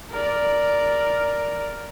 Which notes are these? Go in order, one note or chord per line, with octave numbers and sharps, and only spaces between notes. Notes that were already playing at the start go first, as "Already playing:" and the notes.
A#4 D5